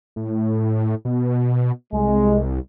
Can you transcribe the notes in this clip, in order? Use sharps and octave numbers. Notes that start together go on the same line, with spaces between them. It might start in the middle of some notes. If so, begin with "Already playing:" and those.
A2
B2
C2 G#3